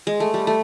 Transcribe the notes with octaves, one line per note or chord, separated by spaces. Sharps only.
G#3
A3
G3
A3